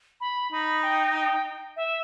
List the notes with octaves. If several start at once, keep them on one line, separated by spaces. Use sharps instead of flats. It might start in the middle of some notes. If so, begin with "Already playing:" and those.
B5
D#4 B5
G5
G5
E5